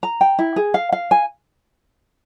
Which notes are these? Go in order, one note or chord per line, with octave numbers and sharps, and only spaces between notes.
A#5
G5
E4
G#4
F5
F5
G#5